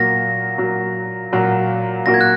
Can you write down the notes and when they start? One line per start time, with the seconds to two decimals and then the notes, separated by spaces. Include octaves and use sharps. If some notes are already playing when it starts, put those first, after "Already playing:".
Already playing: A#2 F#3 A#3 F#4 A#6
0.58 A#2 F#3 A#3 F#4
1.33 A#2 F#3 A#3 F#4
2.06 A#2 F#3 A#3 F#4 A#6
2.14 G#6
2.21 F#6